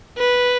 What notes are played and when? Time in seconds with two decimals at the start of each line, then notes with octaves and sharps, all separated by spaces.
0.18 B4